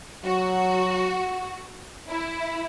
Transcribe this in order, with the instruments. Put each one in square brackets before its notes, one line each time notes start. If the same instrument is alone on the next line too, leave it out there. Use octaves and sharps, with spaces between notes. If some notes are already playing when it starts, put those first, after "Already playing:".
[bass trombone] F#3 [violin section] F#4
[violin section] E4